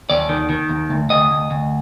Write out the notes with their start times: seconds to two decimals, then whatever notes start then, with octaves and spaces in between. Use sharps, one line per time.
0.10 D#2 D5
0.29 D#3
0.50 D#3
0.69 D#2
0.90 D2
1.10 D2 D#5
1.31 D2
1.51 D2